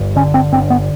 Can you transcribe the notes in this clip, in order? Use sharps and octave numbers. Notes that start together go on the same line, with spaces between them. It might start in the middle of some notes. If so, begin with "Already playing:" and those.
Already playing: G1 G2
D3 C#4
C4
G1 C4
B3